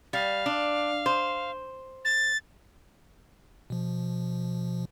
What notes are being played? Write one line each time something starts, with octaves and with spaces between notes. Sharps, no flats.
G3 F5
D4
C5
A6
B2 F3